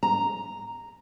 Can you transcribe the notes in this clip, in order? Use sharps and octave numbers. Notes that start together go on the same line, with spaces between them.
A#5